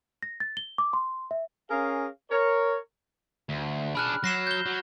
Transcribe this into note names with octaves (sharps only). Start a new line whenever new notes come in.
A#6
A6
G7
D6
C6
E5
C#4 G#4 A#4 F5
A#4 C#5
D2
D4 G#4 B5 F6 F#6
F#3 A#6 C7 E7
G6 G7
F#3